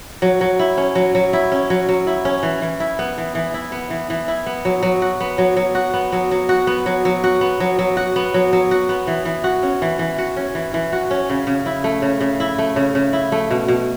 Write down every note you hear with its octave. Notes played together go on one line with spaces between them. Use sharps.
F#3
F#3
E4
C#4
F#3
F#3
E4
C#4
F#3
F#3
E4
C#4
E3
E3
E4
B3
E3
E3
E4
B3
E3
E3
E4
B3
F#3
F#3
F#4
B3
F#3
F#3
F#4
B3
F#3
F#3
F#4
B3
F#3
F#3
F#4
B3
F#3
F#3
F#4
B3
F#3
F#3
F#4
B3
E3
E3
F#4
C#4
E3
E3
F#4
C#4
E3
E3
F#4
C#4
C#3
C#3
E4
A3
C#3
C#3
E4
A3
C#3
C#3
E4
A3
B2
B2